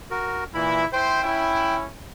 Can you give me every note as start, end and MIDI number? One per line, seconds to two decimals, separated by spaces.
0.11 0.44 66
0.11 0.44 70
0.55 0.85 46
0.55 0.85 52
0.55 0.85 64
0.55 0.85 83
0.93 1.20 64
0.93 1.20 72
0.93 1.76 79
1.23 1.85 61
1.23 1.85 64